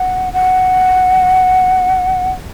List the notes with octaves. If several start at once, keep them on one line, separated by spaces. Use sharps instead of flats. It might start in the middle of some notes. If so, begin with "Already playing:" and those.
Already playing: F#5
F#5